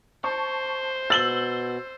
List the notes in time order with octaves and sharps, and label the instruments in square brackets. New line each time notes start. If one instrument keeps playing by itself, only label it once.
[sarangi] C5 [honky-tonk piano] A5 C#6
[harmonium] B2 [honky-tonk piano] E6 [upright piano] A6 F#7 G7